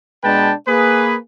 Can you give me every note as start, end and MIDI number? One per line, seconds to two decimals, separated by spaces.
0.24 0.53 47
0.24 0.53 56
0.24 0.53 62
0.24 0.53 71
0.24 0.53 79
0.24 0.53 81
0.68 1.17 58
0.68 1.17 68
0.68 1.17 71